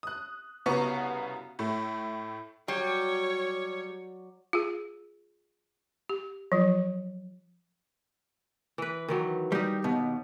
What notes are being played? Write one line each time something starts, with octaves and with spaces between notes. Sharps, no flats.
D#6 F#6
C2 C#3 B3 F#4 A#5 C#6
A2 A3
F#3 G3 C#5
F4 G#4
G4
F3 F#3 F4
E3 B4
D#3 E3 F#3
G3 D#4 G4
D#2 B2